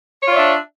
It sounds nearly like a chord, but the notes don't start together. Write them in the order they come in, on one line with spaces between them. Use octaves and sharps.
C#5 F4 D5 E5 D4